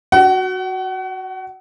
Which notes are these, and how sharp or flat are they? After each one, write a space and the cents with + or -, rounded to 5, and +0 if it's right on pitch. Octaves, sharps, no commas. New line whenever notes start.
F#4 +0 F#5 +35